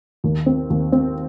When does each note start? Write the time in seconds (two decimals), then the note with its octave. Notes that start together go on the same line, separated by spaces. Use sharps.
0.24 D#2
0.46 C4
0.70 D#2
0.92 C4